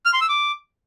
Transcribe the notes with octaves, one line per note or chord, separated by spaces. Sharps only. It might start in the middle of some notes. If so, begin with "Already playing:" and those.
F6
C6
E6
D6